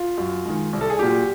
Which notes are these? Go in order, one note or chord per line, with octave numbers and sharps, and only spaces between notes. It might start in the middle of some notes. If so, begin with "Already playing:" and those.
Already playing: F4
F#2
D#3 G#3
C2
A4
G#4
A#2 F#3 G4